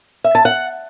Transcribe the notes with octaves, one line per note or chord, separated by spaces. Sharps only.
E5
A5
F#5